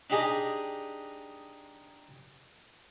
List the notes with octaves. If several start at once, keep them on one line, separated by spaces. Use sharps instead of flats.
D4 D#4 G4 G#4 D#5